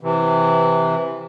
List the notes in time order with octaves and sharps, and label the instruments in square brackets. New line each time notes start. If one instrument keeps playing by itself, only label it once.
[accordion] C3 E3